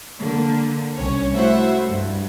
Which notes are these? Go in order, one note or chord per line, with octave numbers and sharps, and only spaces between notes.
D3 A#3
C2 C#4 C#5
A3 E4 F#4 C5 E5 F#5
G2